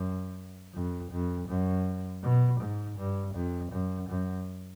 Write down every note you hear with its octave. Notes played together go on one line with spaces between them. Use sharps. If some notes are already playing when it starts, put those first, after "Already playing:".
Already playing: F#2
F2
F2
F#2
B2
G#2
G2
F2
F#2
F#2